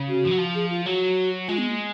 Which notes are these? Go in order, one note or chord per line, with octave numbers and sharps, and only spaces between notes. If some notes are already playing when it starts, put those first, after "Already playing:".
Already playing: C#3
F#4
F3
F#3
F3
G#4
F4
F#3 F#4
G#3 F4
B3
A#3